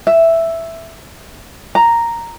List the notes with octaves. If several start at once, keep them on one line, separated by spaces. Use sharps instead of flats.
E5
A#5